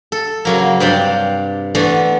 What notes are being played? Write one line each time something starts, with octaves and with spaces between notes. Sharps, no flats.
A4
C#3 F#3 A#3
G2 C3 D5 F5 G5 A5
D3 E3 A3 B3